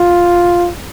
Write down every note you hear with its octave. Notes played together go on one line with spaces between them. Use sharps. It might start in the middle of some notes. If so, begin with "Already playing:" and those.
Already playing: F4